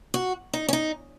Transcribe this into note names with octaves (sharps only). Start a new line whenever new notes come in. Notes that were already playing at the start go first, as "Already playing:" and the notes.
F#4
D#4
C#4
D#4